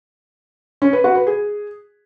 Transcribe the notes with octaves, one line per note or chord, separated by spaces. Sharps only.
C#4
B4
F#4
B4
G#4